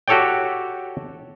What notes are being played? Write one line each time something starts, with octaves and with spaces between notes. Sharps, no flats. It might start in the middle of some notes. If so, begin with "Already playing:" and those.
F#4 G4 A4 C#5 D5 G5